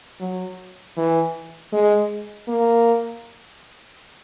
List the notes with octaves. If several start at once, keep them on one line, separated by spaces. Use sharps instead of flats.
F#3
E3
G#3
A#3